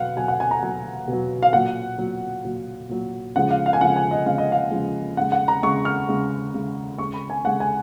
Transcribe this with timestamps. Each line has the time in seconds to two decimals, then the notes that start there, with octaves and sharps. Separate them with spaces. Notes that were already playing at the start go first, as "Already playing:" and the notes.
Already playing: B2 F#3 F5 F#5
0.17 B2 F#3 G#5
0.28 F#5
0.40 G#5
0.51 A#5
0.62 B2 F#3 G#5
1.08 B2 F#3
1.43 F5
1.53 A#2 F#3 F#5
1.98 A#2 F#3
2.45 A#2 F#3
2.89 A#2 F#3
3.36 C#3 F3 G#3 F#5
3.51 F5
3.66 F5
3.73 G#5
3.80 C#3 F3 G#3 F#5
3.96 G#5
4.11 D#5
4.26 C#3 F3 G#3 F5
4.38 D#5
4.52 F5
4.71 C#3 F3 G#3
5.17 C#3 G#3 F#5
5.32 F#5
5.48 A#5
5.63 C#3 G#3 C#6
5.85 F6
6.08 C#3 G#3
6.54 C#3 G#3
6.98 C#3 G#3 C#6
7.14 B5
7.30 G#5
7.44 C#3 G#3 F#5
7.60 G#5